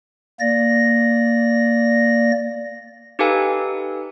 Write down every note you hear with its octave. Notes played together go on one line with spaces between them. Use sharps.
A#3 D5 A#6
D#4 G4 A4 B4 F5 G#5